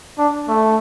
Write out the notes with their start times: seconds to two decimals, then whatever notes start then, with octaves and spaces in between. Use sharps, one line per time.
0.18 D4
0.48 A3